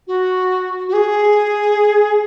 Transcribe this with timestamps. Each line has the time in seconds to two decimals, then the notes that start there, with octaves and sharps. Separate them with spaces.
0.07 F#4
0.88 F#4
0.93 G#4